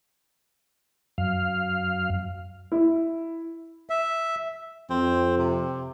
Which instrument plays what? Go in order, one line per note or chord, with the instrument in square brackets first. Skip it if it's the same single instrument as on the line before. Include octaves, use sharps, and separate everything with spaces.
[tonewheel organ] F#2 F5
[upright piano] E4
[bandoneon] E5
[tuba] F2 [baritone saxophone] C4
[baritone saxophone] C3